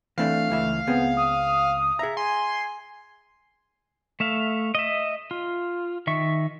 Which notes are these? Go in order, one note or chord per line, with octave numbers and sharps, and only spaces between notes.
E3 A3 C4 D4 F5
C#2 E3 E5
C#2 B3 C4 G#4
D#6
G#4 E5 A#5
G#5 C6
A3 E5 F5
D#5 E5
F4
D#3 E5 C#6